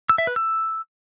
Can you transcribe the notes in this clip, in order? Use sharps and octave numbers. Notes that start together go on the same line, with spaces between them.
E6
E5
B4
E6